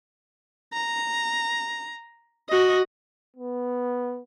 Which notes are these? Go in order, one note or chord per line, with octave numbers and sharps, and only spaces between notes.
A#5
F#4 D#5
B3